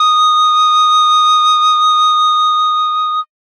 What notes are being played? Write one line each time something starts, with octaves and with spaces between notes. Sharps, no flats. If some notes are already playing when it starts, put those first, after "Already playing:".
Already playing: D#6